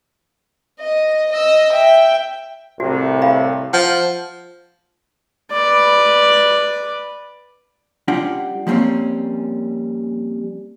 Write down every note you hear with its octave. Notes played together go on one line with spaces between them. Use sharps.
D#5
D#5 E6
E5 G5
C2 A2 C3 F#4
F5 B5
F3 F#5
B4 D5
G3 C#4 D4 F4 F#5 G5
F3 G3 A#3 C4 C#4